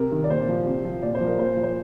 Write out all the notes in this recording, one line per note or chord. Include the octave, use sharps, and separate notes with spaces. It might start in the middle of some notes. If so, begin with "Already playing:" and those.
Already playing: C3 A#4
D#3
D5
A#2 C5
F3
C3
F3
A#2 D5
C5
F3
A#4
A#2 C5
F3
C5